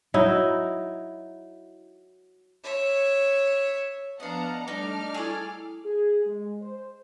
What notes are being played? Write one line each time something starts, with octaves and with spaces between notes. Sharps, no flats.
F#3 D#4 E4
C#5 E5
F3 B3 D4 D#5 F5 F#5 A5 A#5
G3 A3 D4 D#4 D6 F6
E4 G#4 A4 C#6 E6
G#4
G#3
C5